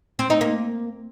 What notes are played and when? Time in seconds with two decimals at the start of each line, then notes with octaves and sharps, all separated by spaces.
0.19 C4
0.30 D#4
0.41 A#3